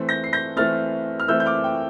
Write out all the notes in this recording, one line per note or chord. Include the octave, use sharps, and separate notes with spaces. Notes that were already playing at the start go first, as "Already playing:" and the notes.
Already playing: E3 A3 C4
G6 A#6
C7
G6 A#6
E3 A3 C4 F6 A6
F6
E3 A3 C4 E6 G6
G6
D6 F6
G5